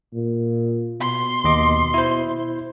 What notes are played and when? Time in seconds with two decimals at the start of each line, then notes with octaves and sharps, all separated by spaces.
0.14 A#2
1.00 B2 C6
1.44 D#2 D#5 D6
1.94 E4 C5